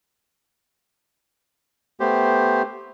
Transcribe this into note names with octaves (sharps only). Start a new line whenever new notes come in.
A3 B3 G4 C5